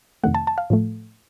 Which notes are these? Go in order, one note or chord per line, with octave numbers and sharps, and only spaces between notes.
F2 C3 D#3 A3 F#5
A5
A5
F5
A2 F3 A3